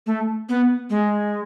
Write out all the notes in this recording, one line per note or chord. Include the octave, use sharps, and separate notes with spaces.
A3
B3
G#3